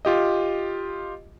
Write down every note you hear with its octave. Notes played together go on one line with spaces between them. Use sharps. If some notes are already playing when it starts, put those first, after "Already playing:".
F4 G4 D#5